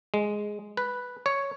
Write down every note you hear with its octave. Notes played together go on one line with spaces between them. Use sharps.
G#3
B4
C#5